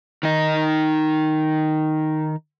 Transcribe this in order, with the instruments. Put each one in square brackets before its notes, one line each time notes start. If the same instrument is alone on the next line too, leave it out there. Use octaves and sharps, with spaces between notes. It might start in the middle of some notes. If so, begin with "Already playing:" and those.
[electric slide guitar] D#3 D#4